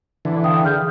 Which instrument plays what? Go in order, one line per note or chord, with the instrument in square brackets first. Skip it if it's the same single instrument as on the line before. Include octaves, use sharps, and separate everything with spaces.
[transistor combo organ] D3 E3
[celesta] F5 G5 D#6
G#4 F6 G6